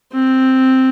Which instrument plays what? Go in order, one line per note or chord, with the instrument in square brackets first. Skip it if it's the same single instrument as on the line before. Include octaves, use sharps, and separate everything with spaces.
[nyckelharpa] C4